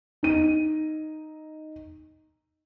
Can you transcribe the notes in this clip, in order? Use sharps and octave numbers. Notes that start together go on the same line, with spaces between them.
D#4 D#7